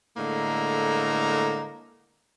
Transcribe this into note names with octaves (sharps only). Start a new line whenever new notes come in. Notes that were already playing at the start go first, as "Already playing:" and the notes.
A2 D3 G#3 A#3 A#5